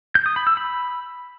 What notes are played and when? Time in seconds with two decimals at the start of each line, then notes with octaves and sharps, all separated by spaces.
0.15 G6
0.26 D#6
0.36 B5
0.47 E6
0.57 B5